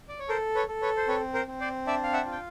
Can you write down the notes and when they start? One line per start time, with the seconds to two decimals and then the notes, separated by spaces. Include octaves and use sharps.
0.09 D5
0.19 C#5
0.29 A4 A#4 C5
0.55 B4 C#5
0.68 A4
0.82 B4 C#5
0.97 C5
1.08 C4 B4 C#5
1.34 A#4 C5
1.47 C4
1.60 C5 D5
1.87 D4 D5 E5
2.03 F5
2.13 E5 F#5
2.26 F4
2.32 G5